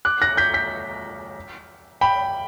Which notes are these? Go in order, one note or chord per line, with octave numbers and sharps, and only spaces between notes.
D6 F#6
F#6 A#6
G6 B6
G6 B6
G5 B5